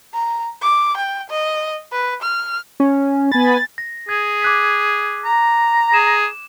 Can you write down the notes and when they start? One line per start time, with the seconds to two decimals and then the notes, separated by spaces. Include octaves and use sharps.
0.14 A#5
0.62 D6
0.97 G5
1.30 D#5
1.92 B4
2.22 F6
2.80 C#4
3.32 B3 G#5 B5 A6
3.78 A#6
4.09 G#4 G#6
4.42 D6 F#6 B6
5.25 A#5
5.94 G#4 E7